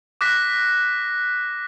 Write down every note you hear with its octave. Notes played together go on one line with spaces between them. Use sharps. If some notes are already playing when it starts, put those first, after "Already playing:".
D6 F#6 A#6 B6